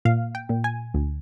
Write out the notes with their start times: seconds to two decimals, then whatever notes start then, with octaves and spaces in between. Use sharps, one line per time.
0.05 A#2 F5
0.35 G5
0.49 A#2
0.64 G#5
0.94 D2